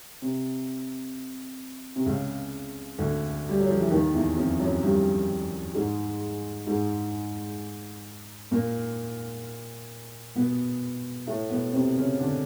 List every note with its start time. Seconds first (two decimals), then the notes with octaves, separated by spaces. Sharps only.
0.22 C3
1.96 C3
2.06 C#2 C#3
2.99 D2 D3
3.49 G3
3.59 F#3
3.69 F3
3.81 E3
3.91 D#2 D#3
4.14 E2 E3
4.36 F2 F3
4.59 F#2 F#3
4.83 G2 G3
5.75 G#2 G#3
6.67 G#2 G#3
8.51 A#2 A#3
10.35 B2 B3
11.27 A2 A3
11.50 B2 B3
11.73 C3 C4
11.97 C#3 C#4
12.19 D3 D4